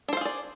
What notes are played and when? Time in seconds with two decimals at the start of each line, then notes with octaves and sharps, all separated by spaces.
0.08 D4
0.13 C5
0.17 F5
0.21 G#4
0.25 D5